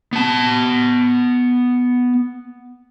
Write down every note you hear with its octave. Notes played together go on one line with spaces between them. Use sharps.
B3 A5